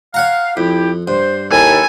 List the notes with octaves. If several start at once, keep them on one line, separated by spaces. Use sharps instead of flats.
C#5 F5 F#5 A#5
F2 E4 G4
G2 C5
D#2 D#4 E4 A4 G#5